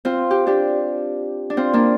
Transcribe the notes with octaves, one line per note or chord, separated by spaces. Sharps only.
C4 F4
G4
D4 G4
D4
C4 F4
A#3 D4